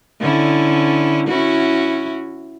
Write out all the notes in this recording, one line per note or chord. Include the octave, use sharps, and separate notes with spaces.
D3 C#4 E4
C#4 E4 F#4